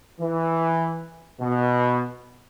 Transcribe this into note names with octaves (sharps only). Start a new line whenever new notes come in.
E3
B2